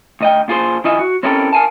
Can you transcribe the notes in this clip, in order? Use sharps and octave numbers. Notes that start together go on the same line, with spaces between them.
D2 D#5 G5
A#2 F4 G#4 C5
D#3 E4 F4 D#5 E5 G#5
F#4
C4 C#4 E4 G4 A4 A#4
A#4 F5 G#5 A5